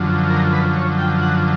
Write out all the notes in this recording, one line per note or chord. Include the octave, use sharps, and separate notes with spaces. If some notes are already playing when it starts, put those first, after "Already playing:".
Already playing: F#2 D3 F3
A#4
B4
C#5
G5
F#5